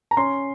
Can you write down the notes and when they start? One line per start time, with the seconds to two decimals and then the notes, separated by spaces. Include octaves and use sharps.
0.11 A#5
0.17 C#4 C6